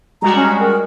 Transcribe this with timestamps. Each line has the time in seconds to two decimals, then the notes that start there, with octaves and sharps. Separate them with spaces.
0.22 G3 G#3 F#4 A#5
0.36 C#4
0.60 A#4